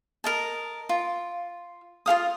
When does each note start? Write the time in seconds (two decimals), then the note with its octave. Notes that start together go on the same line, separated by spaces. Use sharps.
0.24 A#4 D#5 A5
0.89 F4
2.06 F4 A4 F5 D#6